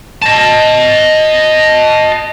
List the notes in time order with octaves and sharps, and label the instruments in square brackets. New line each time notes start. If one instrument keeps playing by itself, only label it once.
[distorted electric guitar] D#5 A5